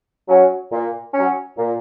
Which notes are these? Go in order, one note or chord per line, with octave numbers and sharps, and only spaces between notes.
F#3 C#4
A#2
F#3 C#4
A#2